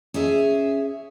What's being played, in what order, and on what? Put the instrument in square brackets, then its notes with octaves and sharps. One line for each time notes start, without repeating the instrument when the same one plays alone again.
[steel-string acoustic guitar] C#4 G#4 E5